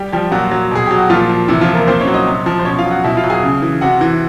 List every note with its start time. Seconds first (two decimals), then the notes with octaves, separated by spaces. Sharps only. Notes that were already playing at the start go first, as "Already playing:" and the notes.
Already playing: G3 G4
0.12 F3 G3 G4
0.31 A#2 F#3 F#4
0.52 F#3
0.71 B2 G#4
0.86 F#3 G4
0.98 F#4
1.10 A#2 F3 F4
1.29 F3
1.48 C3 E3 E4
1.61 F3 F4
1.68 E3
1.74 A#3 A#4
1.87 A#2 C4 C5
2.01 C#4 C#5
2.07 F#3
2.13 D#4 D#5
2.26 C3
2.46 F3
2.59 C5
2.65 B2 C#4 C#5
2.79 F4 F5
2.85 F#3
2.91 F#4 F#5
3.04 B2 E4 E5
3.17 F4 F5
3.24 F#3
3.30 G#4 G#5
3.43 C#3
3.62 E3
3.81 C3 F#4 F#5
4.01 E3